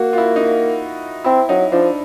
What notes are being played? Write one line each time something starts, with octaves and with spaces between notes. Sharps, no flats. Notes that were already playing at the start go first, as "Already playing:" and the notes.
Already playing: A#3 F#4
F4
E4
D#4
C4 E4
F#3 D#4
F3 D4